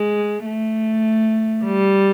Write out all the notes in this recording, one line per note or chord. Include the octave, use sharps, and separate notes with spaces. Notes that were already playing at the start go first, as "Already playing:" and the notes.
Already playing: G#3
A3
G3